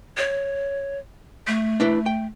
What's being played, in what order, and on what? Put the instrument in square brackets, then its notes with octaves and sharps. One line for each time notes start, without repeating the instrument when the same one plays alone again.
[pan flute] C#5
A3
[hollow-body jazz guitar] D4 E4 B4
G5